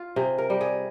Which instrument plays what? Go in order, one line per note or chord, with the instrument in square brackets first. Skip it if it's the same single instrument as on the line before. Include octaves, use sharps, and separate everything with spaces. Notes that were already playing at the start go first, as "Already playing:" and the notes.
Already playing: [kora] F4
C3 G#4
A#4
G3
G#4